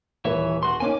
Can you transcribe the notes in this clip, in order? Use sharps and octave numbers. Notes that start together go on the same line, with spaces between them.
D#1 E3 B4 C#5 E5
F#4 C6
A#3 C#4 D#4 G#5 D6